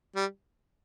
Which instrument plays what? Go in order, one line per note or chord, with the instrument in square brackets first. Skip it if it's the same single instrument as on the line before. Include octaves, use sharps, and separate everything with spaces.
[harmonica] G3